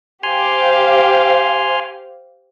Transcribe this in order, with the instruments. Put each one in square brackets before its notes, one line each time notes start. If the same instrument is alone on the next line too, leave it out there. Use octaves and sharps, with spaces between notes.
[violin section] G4 C5 F5 [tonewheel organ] G#5 C6 F6